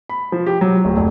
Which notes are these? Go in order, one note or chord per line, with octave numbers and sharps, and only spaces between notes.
B5
F3
G4
F#3
D1
F1